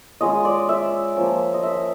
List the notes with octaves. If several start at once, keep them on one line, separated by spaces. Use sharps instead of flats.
G#3 C#4 F4 D#5
D5
E5
F3 A#3 C#4
D#5
E5